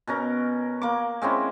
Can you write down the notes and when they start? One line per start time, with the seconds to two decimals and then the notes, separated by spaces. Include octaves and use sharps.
0.07 B2 C#4 A#4
0.82 A#3 D6
1.22 G#3 C4 C#4 E4